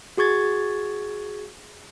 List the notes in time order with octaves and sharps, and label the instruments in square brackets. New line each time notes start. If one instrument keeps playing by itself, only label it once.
[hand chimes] F#4 G#4 C#6 G#6 A6